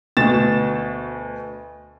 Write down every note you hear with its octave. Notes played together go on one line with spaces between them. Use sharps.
D2 B2 A6 E7